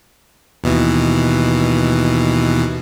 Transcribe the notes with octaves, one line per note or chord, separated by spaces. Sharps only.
D#2 B2 E3